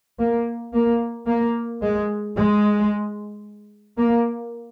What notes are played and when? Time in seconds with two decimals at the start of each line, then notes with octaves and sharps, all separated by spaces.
0.19 A#3
0.73 A#3
1.27 A#3
1.81 G#3
2.36 G#3
3.97 A#3